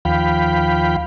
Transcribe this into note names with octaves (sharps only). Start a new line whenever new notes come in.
D#2 F3 F5 G5 B5